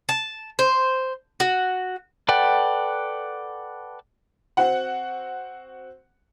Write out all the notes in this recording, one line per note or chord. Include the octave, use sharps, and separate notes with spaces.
A5
C5
F#4
A4 B4 D5 F#5 G5
C4 F#4 F#5